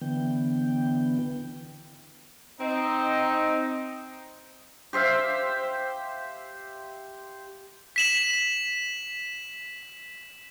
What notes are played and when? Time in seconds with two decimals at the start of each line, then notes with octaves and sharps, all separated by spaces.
0.01 D3 E3 B3 G5
2.60 C4 D#4
4.93 G4 C5 E5 F5
7.96 B6 E7 F#7